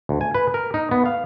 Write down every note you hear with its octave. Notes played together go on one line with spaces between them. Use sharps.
D2
G#5
B4
A#4
D#4
B3
F5